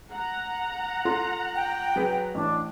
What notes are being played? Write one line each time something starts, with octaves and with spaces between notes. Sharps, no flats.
F#5 A#5
F4 A4 C6
G5
F#3 G#4 B4
A1 D4